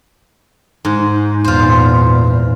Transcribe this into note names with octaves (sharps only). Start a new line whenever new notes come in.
G#2
E2 A#2 F4 C5